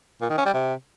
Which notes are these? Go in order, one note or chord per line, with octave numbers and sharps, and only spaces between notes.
A#2
D#3
C#4
G3
C3